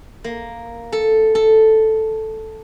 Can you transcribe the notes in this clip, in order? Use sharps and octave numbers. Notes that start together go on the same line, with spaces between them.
A#3
A4
A4